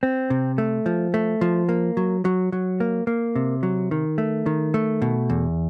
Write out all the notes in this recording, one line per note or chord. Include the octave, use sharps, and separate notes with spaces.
C4
C3
A3
F3
A3
F3
A#3
F#3
F#3
F#3
A#3
A#3
C3
F#3
D#3
A3
D#3
A3
B2
E2